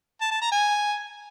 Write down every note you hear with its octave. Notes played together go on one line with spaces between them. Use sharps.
A5
A5
A#5
G#5